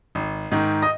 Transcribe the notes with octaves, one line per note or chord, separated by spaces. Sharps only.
G#1
G#2 D#3
D#5